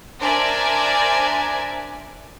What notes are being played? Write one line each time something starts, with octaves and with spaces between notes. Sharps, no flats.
D4 A#4 C5 D5 E5 G#5